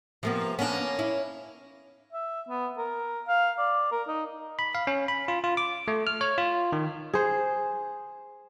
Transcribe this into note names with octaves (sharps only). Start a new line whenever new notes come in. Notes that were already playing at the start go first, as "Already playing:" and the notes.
C3 F3 A#3 B3
A#3 B3 C#4 D4
E4
E5
B3
A#4
F5
D5
A#4
D#4
B5
F5
C#4
B5
F4
F4
D6
A3
F6
C#5
F4
D#3
G#4 C5